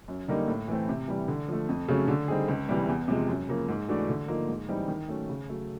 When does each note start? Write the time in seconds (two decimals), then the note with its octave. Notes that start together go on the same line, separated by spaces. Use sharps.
0.08 F#2
0.28 D3 G3 A#3 D#4
0.48 A2
0.68 E3 A3 C4
0.89 C3
1.08 E3 G3
1.28 D3
1.48 F3 A3
1.69 F2
1.88 C#3 F#3 A3 C#4
2.08 D3
2.28 G3 C4 D#4 G#4
2.48 C#2
2.69 C3 E3 G3
2.89 E2
3.08 C3 F3 G#3
3.28 F#2
3.48 C#3 F3 A#3
3.68 G#2
3.89 E3 A3 D4 F#4
4.09 D3
4.28 F3 A#3 D#4
4.49 G#2
4.68 E3 G3 C4 D#4
4.88 D#3
5.09 F#3 A3 C#4
5.29 C#3
5.49 F#3 A3